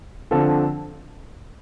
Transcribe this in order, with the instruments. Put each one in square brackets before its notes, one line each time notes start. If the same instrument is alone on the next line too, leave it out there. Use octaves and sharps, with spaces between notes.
[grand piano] D3 F3 C4 F4 A4